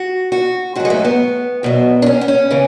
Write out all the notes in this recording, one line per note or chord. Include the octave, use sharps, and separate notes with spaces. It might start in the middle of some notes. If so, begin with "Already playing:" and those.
Already playing: F#4
F#4
G#2 F#3 F#4
G#3
A3
B3
E2 B2 F#3
D4
C#4
B3
C#4
C#3 E3